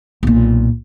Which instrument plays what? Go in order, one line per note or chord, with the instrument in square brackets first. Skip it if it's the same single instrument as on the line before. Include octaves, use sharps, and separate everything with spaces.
[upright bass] B1 A#2